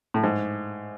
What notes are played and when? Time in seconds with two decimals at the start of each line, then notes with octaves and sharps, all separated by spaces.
0.14 A2
0.24 G#2